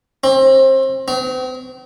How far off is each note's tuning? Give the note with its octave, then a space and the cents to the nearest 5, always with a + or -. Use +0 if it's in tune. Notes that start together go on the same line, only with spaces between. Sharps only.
C4 +30
C4 -40